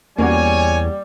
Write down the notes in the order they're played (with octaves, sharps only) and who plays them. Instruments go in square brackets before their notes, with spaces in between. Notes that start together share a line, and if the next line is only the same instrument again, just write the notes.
[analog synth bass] E2 [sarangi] G3 [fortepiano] A#3 C#4 F#4 [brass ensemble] C#5 G#5